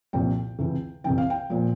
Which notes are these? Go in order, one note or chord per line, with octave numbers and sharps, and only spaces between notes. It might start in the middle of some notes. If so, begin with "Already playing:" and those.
C2 A#2 F3 G5
C#2 C3 E3
C2 C3 E3 G5
F5
G5
A#2 F3